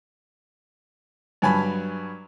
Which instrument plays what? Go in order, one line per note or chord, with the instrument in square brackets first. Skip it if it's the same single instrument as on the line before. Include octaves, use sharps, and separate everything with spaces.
[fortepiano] G2 F#3 G#5 A5 B5